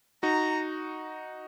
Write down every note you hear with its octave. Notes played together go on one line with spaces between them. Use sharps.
D#4 F#4 A#5